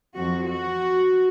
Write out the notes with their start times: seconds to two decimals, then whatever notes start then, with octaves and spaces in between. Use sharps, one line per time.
0.16 F2 F#4
0.49 F#4